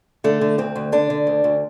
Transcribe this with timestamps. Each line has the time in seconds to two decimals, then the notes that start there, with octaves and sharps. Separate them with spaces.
0.24 D3 A3
0.41 D3
0.58 D2 C4
0.76 D2
0.92 D3 D4
1.10 D3
1.27 D2
1.44 D2